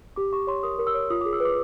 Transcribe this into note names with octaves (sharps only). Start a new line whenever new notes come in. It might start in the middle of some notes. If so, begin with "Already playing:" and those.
G4 D6
G4 C#6
C#5 C6
A#4 D#6
A#4
E6
C#5
F4 D#6
D6
G#4
E6
B4 D6